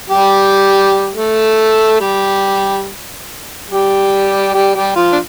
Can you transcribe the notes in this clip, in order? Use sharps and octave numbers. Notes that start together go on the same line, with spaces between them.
G3 G4
A3 A4
G3 G4
G3 G4
G3 G4
G3 G4
F3 F4
D4